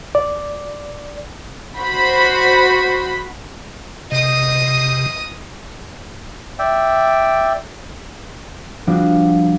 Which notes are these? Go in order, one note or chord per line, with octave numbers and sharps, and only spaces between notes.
D5
F#4 C5 B5
C3 D#5 D#6
D5 E5 G5
F3 G3 C4 D4 F#4 D5